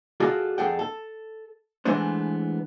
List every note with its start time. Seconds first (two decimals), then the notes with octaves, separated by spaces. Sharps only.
0.20 F4 F#4 G#4 A4 D5
0.58 F2 G#4 A4 F#5 G5
0.79 A4
1.85 E3 G#3 A3 B3 D4 C5